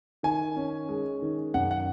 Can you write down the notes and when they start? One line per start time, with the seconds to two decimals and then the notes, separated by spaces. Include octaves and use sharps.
0.23 D#3 G#5
0.56 C#4
0.89 G#3
1.22 D#3
1.54 F#2 F#5
1.71 F#5